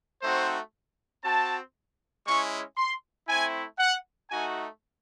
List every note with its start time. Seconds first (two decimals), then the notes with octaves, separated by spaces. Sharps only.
0.23 A3 C4 D#4 F#4 C5
1.24 C4 F#4 A5
2.26 G#3 C#4 E4 C#6
2.77 C6
3.28 A3 C4 E4 G#5
3.79 F#5
4.31 A3 D#4 F#4 G#5